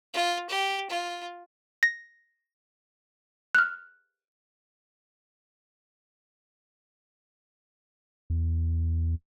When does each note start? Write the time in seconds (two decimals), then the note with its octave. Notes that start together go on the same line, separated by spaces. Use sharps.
0.14 F4
0.50 G4
0.90 F4
1.83 A#6
3.55 F6 F#6
8.30 E2